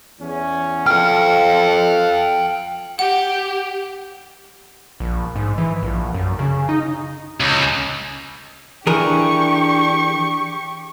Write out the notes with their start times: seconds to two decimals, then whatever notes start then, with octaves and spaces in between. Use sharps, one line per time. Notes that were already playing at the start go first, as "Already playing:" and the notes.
0.20 E2 C#4
0.87 F3 C4 A4 F5 G5 F6
2.99 G4 F#5
5.00 A#1
5.36 G#2
5.58 E3
5.83 A#1
6.14 F#2
6.39 C#3
6.69 D#4
7.40 C#2
8.87 E3 D4 G4 G#4 A#4 C#6